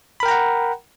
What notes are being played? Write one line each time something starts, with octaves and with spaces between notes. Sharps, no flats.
A#4 F#5 G5 A#5 B5